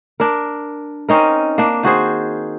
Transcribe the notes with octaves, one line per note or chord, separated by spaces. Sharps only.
D4 A#4
C4 C#4 D#4 A#4
A#3 D4
D#3 F#4 G#4 C5